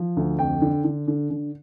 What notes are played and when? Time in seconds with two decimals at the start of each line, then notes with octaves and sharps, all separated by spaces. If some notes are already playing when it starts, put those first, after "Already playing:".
Already playing: F3
0.17 D2
0.39 F2 G5
0.62 D3
0.84 D3
1.08 D3
1.30 D3